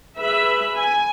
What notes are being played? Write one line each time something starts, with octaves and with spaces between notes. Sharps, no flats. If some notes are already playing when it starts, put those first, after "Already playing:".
G#4 B4 E5 B5
G#5